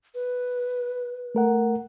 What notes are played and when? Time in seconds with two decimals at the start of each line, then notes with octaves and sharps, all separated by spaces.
0.15 B4
1.35 A3 A#4 F#5